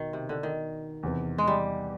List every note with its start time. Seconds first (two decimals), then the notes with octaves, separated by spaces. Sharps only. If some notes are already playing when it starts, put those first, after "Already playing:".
Already playing: B2 D#3
0.13 C3
0.29 D3
0.43 D#3
1.03 E2 C3 E3
1.38 G#3
1.47 G3